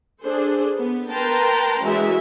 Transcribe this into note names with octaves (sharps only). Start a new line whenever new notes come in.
D4 G#4 A4 C5
B3
A#4 B4 G5 A5 A#5 C6
E3 G#3 C#4 F#4 G#4 E5